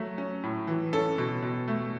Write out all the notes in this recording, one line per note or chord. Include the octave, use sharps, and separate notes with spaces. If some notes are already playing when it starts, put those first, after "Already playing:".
Already playing: F#3 A3
C#4
A2
E3
C#4 A4
B2
B2
A3